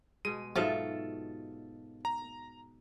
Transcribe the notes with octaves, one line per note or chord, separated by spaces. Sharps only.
B2 G#3 D#7
G#2 B2 F3 F#3 F4 A4 E5
A#5